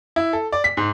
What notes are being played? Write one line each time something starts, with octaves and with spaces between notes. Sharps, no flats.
E4
A4
D5
B6
G#2